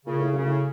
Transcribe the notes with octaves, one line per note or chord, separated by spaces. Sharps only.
A#2 C#3
A2
F#2 C#3
A2